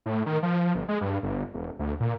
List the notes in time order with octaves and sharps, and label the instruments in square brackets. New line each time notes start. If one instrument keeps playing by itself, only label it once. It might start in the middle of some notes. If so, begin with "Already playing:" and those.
[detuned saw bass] A2
D#3
F3
G1
G#3
G2
G1
E1
D2
A#2